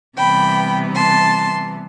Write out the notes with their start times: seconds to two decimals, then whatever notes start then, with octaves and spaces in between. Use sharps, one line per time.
0.17 C3 E3 G3 B3 G5 B5
0.94 A5 C6